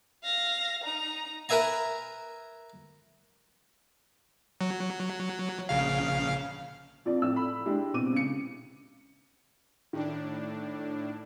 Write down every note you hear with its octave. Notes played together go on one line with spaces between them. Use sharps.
F5 A#6
D#4 A#5
A#4 B4 E5 G#5 A#5
F#3
A#1 C#3 F5
F2 F3 D5
F2 A2 E4 D5 E6
B5
G#3 D4 E4 G4
B2 C4 D6 D#7
C#3 C#7
A2 D#3 D4